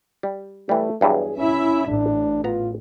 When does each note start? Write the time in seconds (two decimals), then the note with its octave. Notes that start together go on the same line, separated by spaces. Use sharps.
0.23 G3
0.69 E3 G3 A3
1.01 E2 G2 F#3 G#4
1.38 C#4 E4 E5
1.87 A1 D4
2.44 B3 F4 A#5